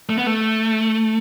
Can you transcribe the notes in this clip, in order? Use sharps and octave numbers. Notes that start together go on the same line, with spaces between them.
A3
B3
A3